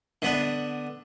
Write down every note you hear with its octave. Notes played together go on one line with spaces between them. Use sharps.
D3 B3 D4